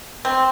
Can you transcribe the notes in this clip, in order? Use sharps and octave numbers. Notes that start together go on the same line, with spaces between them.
C4